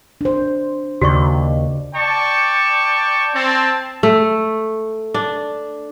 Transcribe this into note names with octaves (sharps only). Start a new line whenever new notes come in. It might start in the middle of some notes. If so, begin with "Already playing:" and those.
D4 C5
D#2 C#3 F#4 D5 C#6
D5 G5 A5 C#6
C4 A5
A3
D4